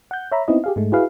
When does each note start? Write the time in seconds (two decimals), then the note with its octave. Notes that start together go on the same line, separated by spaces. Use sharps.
0.11 F#5 G6
0.32 C#5 E5 A#5 B5
0.48 B3 C4 D#4 E4 D#5
0.64 G4 G#4 F5
0.76 G#2 G#3 A3
0.92 E4 F#4 G#4 B4 F5